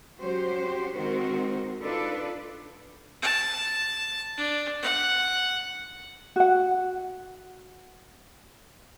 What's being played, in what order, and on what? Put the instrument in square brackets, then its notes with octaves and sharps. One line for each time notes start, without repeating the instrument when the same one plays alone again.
[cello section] F#3 C#4 F#4 G4 C5
D#3 G#3 C4 F#4 A#4 C5
D4 D#4 F4 A4 B4 D5
[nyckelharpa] A5
D4
F#5
[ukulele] F#4 F#5